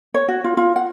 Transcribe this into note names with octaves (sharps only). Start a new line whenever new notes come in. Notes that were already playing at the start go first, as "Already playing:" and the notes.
C#5
F#4
F4
F4
F#5